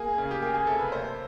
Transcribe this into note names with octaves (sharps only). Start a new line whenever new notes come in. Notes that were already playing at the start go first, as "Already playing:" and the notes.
Already playing: A#3 G#4
C#3
G4
A#3 G#4
G#4
C3 A4
B4
A#3 C5